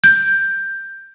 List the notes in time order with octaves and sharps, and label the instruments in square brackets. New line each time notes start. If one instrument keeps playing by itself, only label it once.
[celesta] G6